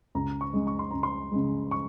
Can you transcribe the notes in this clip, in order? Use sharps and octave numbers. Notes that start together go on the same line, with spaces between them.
C#2 A#5
C#6
C#3 G#3
C#6
C6
C#2 A#5
C6
C#3 G#3
C#6